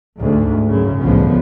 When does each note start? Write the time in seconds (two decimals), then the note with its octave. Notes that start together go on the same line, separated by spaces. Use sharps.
0.18 D2 G#2
0.68 F#2 C#3
1.00 G1 C#2 A2 D3 F3 B3